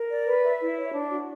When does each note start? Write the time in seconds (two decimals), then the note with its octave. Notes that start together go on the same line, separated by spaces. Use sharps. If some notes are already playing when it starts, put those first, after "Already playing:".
Already playing: A#4
0.09 D5
0.26 B4
0.43 E5
0.60 E4
0.77 C#5
0.94 D4
1.10 F#4